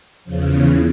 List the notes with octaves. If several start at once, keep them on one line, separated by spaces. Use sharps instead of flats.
E2 C#3 F3
E2 C#3 E3